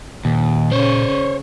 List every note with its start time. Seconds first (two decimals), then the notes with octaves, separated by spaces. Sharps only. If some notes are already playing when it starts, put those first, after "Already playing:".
0.25 D#2 A#2
0.72 C#3 C#4 C5 C#5